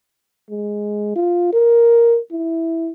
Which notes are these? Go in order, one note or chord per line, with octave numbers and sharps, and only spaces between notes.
G#3
F4
A#4
E4